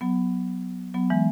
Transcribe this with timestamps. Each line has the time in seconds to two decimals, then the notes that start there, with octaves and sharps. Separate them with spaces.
0.01 F#3 B3
0.94 F#3 B3
1.10 E3 G#3